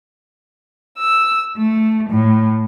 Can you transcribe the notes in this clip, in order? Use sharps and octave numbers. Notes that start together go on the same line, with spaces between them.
E6
A3
A2